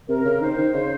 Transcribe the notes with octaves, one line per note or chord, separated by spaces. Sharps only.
C3 A#4
C#3
D#3 C5
D#3
C#3